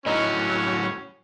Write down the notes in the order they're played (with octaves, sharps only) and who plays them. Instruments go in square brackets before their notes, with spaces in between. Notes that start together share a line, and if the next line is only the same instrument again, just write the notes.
[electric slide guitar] A2 F#3 [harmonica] C#4 [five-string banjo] D#4 E4 D#5